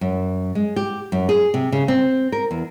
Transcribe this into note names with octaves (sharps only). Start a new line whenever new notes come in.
F#2
G#3
G4
F#2
G#4
C3
C#3
C4
A#4
E2